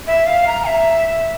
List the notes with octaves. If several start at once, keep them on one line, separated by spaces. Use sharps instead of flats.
E5
F5
A#5
E5